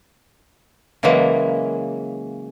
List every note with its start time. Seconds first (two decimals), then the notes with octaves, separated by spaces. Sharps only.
1.03 C#3 E3 F#3 G#3 A#3